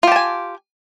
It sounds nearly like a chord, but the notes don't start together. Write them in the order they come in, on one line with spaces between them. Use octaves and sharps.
F4 G4 A5 G#5